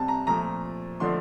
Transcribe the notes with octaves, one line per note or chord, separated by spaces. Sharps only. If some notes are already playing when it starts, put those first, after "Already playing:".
Already playing: C3 G3 C4 A5
A#5
A#2 F3 A3 A#5
D3 F3 A3 D4 C6